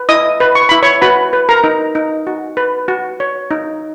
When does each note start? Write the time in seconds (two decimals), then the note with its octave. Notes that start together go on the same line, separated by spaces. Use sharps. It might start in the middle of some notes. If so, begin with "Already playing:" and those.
Already playing: B4
0.09 E4 D#5 D#6
0.40 B4
0.55 C#6
0.69 E4 B5
0.83 C#5 C#6
1.02 F#4 B4 B5
1.33 B4
1.49 A#4 A#5
1.64 D#4
1.95 D#4
2.27 F#4
2.57 B4
2.88 F#4
3.20 C#5
3.51 D#4